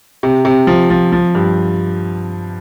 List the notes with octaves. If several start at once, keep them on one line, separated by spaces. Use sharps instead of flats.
C3
C3
F3
F3
F3
G2